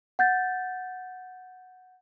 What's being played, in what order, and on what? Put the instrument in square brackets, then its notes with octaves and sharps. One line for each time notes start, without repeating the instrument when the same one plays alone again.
[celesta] F#5 G6 A6